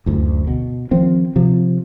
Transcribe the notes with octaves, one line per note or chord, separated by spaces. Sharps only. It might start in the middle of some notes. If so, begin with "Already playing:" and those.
F#1 D2
B2
D#3 F3 C4
C3 F3